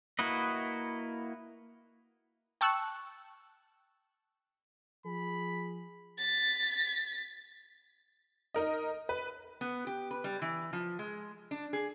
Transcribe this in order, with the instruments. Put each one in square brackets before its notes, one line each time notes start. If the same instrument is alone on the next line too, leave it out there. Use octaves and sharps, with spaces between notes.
[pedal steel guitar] A#3 E4 F#4 B4 D#5
[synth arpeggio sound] G5 A5 C#6 E6 F#6 C#7
[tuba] F3 [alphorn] G#4 [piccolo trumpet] B5
[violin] A6 B6
[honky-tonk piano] D#4 A#4 D#5
B4
[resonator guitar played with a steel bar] B3
G4
B4
G3
E3
F3
G#3
D4
G#4